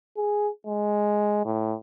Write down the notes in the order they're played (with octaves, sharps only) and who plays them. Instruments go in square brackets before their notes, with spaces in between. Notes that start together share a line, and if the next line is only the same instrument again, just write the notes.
[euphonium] G#4
G#3
A2